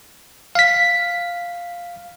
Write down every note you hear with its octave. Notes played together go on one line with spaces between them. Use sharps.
F5 B6